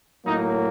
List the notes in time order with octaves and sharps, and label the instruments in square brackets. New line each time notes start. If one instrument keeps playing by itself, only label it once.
[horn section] A2 F#3 A#3 D#4